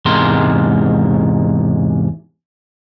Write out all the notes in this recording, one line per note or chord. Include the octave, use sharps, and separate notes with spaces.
E2 G#2 C3 G#3 A#4 C6